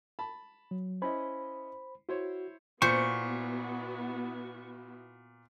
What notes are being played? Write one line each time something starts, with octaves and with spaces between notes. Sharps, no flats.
A5 B5
F#3
C#4 E4 C5 D#5 B5
E4 F#4 C5 C#5
A#2 B3 E4 F#4 C5 C#6 C#7